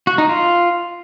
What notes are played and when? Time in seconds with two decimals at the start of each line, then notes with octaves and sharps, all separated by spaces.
0.07 F#4
0.18 D#4
0.29 F4